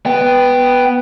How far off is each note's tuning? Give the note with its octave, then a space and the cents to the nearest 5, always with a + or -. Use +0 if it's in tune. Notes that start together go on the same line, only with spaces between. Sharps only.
B3 +0 G5 +0